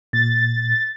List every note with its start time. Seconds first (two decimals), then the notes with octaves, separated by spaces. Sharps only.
0.13 A#2 A6